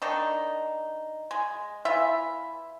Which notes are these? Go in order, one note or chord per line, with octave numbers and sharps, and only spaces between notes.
D#3 D4 D#4
G#3
E3 F4 E5